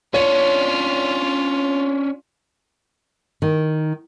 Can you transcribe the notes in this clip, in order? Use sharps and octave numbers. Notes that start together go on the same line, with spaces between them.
C#4 D4 F4 C#5
D#3